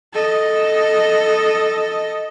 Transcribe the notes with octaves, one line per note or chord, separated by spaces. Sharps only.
A4 D#5